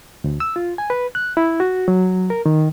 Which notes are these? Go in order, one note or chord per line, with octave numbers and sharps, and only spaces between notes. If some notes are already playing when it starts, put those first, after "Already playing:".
D2
E6
F4
G#5
B4
F#6
E4
F#4
F#3
A#4
D#3